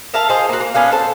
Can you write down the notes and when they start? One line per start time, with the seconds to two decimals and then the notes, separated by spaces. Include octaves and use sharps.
0.14 A#4 E5 F5 A5
0.29 F4 G#4 C5 D#5
0.49 A#3 F#4
0.60 A#3
0.74 B3 C#4 D4 F5
0.92 A4 C5 A5